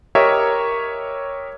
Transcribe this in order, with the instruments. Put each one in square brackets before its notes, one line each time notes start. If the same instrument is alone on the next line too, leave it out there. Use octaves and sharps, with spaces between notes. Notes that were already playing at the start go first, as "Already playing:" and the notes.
[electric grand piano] G4 A#4 C#5 D#5 E5